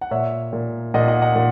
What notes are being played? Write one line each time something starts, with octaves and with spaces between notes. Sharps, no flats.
F#5
A#2 C#5 E5
A#2
A#2 D#5 F#5
D#5 F#5
D#5 F#5
A#2